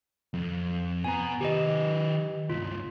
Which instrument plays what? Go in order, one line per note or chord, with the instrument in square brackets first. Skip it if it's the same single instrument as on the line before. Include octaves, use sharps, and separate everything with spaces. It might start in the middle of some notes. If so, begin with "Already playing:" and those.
[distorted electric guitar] F2
[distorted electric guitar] B2 [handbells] G#5 A#5
[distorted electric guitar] D#3 B4 [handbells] G4 D#5
[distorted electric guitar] C#2 G2 [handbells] F4